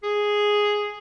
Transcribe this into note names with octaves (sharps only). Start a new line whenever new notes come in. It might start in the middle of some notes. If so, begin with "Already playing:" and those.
G#4